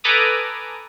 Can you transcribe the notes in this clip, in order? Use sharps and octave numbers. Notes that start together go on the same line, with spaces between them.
A4 B4 G#5 A#5 D6 D#6